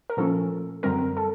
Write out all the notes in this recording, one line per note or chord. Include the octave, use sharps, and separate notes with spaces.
A#4
A#2 F3 A3 C#4 A4
F#2 D3 G3 C4 A#4
A4